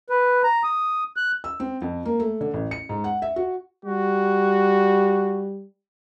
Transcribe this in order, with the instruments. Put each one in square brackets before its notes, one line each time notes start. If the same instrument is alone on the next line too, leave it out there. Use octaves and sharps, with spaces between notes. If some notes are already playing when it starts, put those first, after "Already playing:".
[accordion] B4
A#5
D#6
F#6
[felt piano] E6
C4
F2
A#3
A3
D3
A1
C#7
G#2
F#5
E5
F#4
[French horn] G3 [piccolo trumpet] F#4